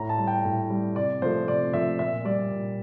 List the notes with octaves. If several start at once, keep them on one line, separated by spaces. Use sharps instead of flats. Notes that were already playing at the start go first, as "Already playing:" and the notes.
Already playing: A2 A#5
A5
G3
G5
A2
G3
C3 D5
F3 A3 C5
C3 D5
F3 A3 E5
A#2 E5
G3 D5
A#2